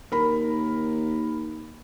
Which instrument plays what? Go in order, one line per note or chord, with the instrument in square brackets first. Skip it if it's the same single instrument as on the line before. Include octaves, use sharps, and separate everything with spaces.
[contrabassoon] D#2 [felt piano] A#4 B5